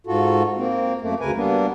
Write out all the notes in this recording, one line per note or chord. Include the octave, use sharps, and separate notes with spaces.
G#2 F4 F#4 A4
A#3 C4
F#2 A3 A#3
D2 C#3 A#4 B4 G#5
G3 A#3 B3 D4